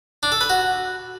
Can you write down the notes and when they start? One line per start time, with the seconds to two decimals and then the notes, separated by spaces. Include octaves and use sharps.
0.23 D4
0.32 A4
0.41 B4
0.50 F#4